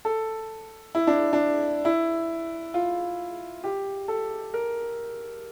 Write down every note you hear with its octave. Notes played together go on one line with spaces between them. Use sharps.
A4
E4
D4
D4
E4
F4
G4
A4
A#4